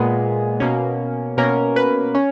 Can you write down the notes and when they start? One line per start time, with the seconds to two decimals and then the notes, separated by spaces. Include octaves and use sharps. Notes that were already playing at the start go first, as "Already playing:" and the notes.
Already playing: A#2 G#3 B3 G#4
0.60 B2 A#3 C#4
1.37 B2 A#3 C#4 A#4
1.76 B4
2.15 C#4 C#5